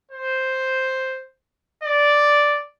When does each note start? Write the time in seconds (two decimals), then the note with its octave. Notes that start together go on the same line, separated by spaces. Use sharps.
0.11 C5
1.83 D5